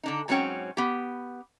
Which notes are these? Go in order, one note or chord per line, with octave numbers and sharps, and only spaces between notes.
D3 D4 D#4
G#2 F#3 C4 C#4 C#5 G5
B3 G4